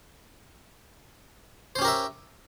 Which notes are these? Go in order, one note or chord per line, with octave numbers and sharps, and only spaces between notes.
C#4 G4 A#4 C5 E5